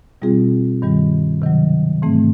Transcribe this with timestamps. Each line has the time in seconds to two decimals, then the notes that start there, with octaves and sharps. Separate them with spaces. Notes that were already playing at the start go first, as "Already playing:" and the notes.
0.22 B2 G3 C4 F4 G#4
0.82 G2 D#3 G3
1.42 C3 D#3 F#3
2.02 G#2 E3 A3 C4